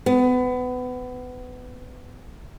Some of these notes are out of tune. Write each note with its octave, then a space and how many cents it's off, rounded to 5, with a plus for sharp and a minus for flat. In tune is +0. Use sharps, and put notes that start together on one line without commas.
B3 +25